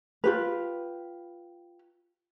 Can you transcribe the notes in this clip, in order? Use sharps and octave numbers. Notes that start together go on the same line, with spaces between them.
F4 G4 B4